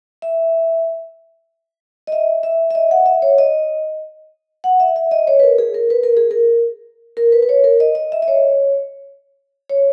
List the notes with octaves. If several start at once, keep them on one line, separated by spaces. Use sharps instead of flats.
E5
D#5
E5
E5
E5
D#5
F#5
E5
C#5
D#5
F#5
E5
E5
D#5
C#5
B4
A#4
G#4
A#4
B4
A#4
G#4
A#4
A#4
B4
B4
C#5
A#4
D#5
D#5
E5
D#5
C#5
C#5